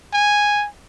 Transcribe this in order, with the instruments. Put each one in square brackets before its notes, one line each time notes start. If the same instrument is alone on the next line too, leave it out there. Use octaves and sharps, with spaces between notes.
[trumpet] G#5